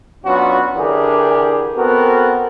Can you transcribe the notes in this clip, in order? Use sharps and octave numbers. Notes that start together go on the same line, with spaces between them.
F#3 B3 C#4 D4 F4 F#4
D3 E3 D4 G4 G#4 A#4
B3 C4 F#4 A4 A#4